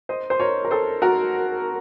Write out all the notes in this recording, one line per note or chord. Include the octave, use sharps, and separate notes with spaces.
C5 D#5
C5
A#4 C#5
A#4
A4 C5
F#4 A#4